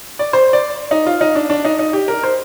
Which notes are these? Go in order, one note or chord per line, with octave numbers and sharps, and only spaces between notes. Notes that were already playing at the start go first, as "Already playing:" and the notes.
D5
C5
D5
D#4
F4
D#4
D4
D4
D#4
D#4
G4
A#4
C5